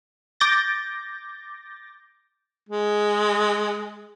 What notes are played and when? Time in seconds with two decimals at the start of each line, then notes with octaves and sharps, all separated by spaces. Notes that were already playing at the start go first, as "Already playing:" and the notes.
0.40 D6 G6 A6 A#6
2.69 G#3